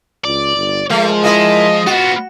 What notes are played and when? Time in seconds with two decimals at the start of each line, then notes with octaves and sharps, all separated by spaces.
0.25 C#2 D5
0.56 G1
0.90 F3 G#3 A3
1.24 A#3 E4 D#5
1.87 B3 F4 F#4